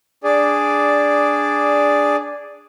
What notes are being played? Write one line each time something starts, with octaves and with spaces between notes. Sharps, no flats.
D4 G#4 D5